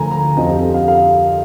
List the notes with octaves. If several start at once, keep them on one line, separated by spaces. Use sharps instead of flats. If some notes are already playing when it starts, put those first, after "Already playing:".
Already playing: D2 D3 F3 G#5 A#5
A#5
F2 D3 F3 D#5
G4
F5
F5